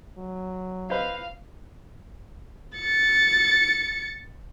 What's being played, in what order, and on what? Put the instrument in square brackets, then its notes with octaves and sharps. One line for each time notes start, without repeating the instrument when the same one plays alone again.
[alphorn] F#3
[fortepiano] B4 C5 D#5 [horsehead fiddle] F5
[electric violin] A6 C#7